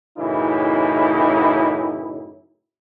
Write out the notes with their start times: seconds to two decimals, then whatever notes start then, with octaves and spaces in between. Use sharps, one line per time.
0.18 F#2 A2 C#3 E3 D#4 E4